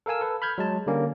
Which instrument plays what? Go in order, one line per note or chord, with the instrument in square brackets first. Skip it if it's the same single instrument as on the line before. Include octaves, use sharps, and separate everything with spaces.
[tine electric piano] A4 A#4 F5 G#5 E6
A4 B4
B5 F6 G6 G#6
F#3 G#3 A5
D3 G3 A#3 C#4